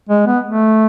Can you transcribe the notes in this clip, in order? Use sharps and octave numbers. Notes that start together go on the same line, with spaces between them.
G#3
B3
A3